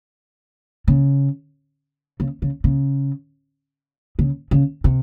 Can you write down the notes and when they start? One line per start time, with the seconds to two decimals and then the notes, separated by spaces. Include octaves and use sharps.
0.88 C#3
2.20 C#3
2.42 C#3
2.64 C#3
4.19 C#3
4.51 C#3
4.84 C3